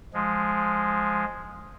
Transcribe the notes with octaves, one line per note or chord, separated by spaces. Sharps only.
F3 G#3